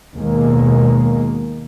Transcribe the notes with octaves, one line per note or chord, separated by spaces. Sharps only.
D#2 B2 G#3 A#3